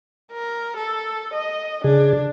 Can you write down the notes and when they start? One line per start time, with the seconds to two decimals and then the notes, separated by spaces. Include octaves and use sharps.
0.32 A#4
0.77 A4
1.33 D#5
1.84 C#3 D4 G#4